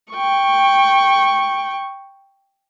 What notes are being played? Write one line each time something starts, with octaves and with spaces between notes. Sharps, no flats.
G5 C#6